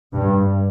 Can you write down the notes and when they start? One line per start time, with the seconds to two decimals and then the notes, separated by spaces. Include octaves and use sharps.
0.13 G2